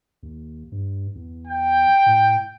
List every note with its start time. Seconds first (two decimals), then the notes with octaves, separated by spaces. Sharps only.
0.23 D#2
0.72 G2
1.15 E2
1.47 G5
2.06 A2